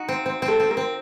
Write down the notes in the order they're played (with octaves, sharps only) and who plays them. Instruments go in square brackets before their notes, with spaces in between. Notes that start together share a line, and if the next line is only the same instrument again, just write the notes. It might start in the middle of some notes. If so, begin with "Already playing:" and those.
Already playing: [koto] D#4 F#4
C4
C4
C4
[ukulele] A4
[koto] C4
[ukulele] A#4
[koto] C4